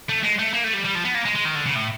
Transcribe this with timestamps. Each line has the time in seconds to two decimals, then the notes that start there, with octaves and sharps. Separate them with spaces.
0.09 A3
0.23 G#3
0.39 A3
0.53 A#3
0.64 A3
0.74 G3
0.85 G3
0.95 F3
1.05 B3
1.14 A#3
1.25 G#3
1.36 G#3
1.45 D#3
1.56 D3
1.66 C#3
1.75 A2